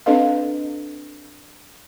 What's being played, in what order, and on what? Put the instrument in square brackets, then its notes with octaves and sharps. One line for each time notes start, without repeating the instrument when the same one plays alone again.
[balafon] C4 D4 A4 B4 D#5 F5